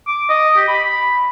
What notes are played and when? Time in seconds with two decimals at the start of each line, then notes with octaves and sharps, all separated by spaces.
0.08 D6
0.30 D#5
0.57 G4
0.68 B5